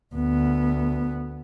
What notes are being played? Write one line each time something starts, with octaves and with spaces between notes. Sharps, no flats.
D2 B3